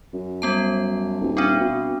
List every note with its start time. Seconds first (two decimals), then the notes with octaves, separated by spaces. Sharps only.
0.14 F#2
0.42 G3 B3 A5
1.21 D#1
1.37 B3 C4 D4
1.60 B2